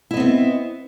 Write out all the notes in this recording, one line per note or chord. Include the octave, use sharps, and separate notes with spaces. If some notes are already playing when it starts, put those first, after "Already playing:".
B3 C4 E4 D#5